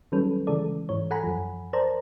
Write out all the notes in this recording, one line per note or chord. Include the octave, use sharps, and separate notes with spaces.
D#3 F#3 G3 C#4 A4 B4
C#3 E3 G#3 A4 D5
G#2 E3 C#5
A4 F#5 G#5 A#5 B5
F#2 F3
A#4 C5 D5 A5 A#5